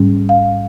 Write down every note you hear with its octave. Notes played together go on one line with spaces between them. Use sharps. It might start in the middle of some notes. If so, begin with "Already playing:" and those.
Already playing: G#2 G3 C#4
F5